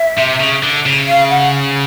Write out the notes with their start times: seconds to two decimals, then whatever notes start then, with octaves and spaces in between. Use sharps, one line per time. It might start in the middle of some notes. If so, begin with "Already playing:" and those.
Already playing: E5
0.18 C3
0.40 C#3
0.63 D3
0.86 C#3
1.08 F5
1.30 F#5